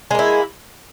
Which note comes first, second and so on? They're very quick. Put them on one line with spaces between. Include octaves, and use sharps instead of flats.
G#3 A#3 E4